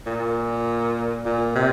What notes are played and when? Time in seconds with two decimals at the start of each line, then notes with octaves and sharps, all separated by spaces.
0.07 A#2
1.26 A#2
1.56 C3